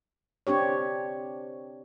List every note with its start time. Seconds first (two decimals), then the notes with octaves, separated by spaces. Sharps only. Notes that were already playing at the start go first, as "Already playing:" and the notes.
0.47 C4 D4 G4 C#5